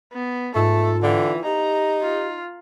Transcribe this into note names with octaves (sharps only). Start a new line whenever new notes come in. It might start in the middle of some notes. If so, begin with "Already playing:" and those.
B3
G#2 A3 F4 A4
D3 E3 D5 F5 G5
D#4 G4 A#5
F4